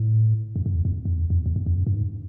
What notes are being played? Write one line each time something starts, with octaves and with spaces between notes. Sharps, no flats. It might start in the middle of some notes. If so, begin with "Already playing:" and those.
Already playing: A2
F#2
F#2
E2
F2
F2
E2
F2
E2
F2
F2
F#2
G2
G#2